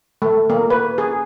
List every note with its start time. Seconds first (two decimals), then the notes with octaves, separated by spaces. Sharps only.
0.22 A3
0.50 A#3
0.70 B4
0.98 G#4